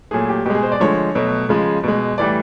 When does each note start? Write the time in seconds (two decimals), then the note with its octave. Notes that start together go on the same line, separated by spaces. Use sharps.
0.11 A#2 F#3 A3 G#4
0.29 G4
0.45 B2 G4
0.50 G#3 G#4
0.63 C5
0.72 D5
0.80 D3 F3 G#3 C#5
1.15 B2 F#3 A3
1.49 C#3 F3 G#3
1.84 B2 G#3
2.18 A2 E3 G3 D5